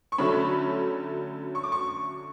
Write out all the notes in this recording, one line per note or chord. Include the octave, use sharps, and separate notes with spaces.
C#6
D3 F#3 A3 C#4 B5
C#6
D6
C#6